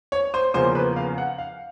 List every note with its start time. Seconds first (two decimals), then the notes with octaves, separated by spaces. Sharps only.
0.12 C#5
0.34 C5
0.54 E2 C#3 F3 A#3 C#4 C5
0.75 B4
0.96 F5
1.18 F#5
1.38 F5